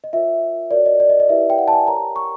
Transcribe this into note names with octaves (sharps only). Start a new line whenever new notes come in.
D#5
F4 A#4 C#5 E5
F#4 A#4 C#5 D5
D#5
D5
D#5
D#5
E4 G4 B4 D5 E5
G5
F#5
A5
G#5
G4 A#4 C#5 A#5
C#6